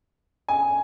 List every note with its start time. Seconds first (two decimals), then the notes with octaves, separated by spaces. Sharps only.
0.49 G#5